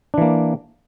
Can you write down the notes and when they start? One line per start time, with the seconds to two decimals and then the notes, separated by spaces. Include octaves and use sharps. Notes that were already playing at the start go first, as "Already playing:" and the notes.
0.14 D4
0.18 E3
0.21 A#3